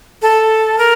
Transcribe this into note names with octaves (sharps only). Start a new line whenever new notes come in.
A4
A#4